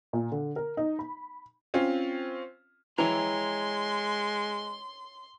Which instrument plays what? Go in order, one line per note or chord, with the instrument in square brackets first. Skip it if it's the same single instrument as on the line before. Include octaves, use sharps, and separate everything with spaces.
[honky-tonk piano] A#2
D3
A#4
D#4
B5
[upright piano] C4 C#4 F4
[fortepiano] E3 [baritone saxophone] G#3 [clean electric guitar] C#5 G5 A#5 [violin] C6